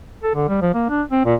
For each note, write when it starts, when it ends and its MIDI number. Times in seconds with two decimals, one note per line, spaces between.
0.23 0.34 69
0.35 0.47 50
0.48 0.58 55
0.62 0.70 53
0.74 0.85 58
0.89 1.03 62
1.11 1.22 60
1.25 1.35 46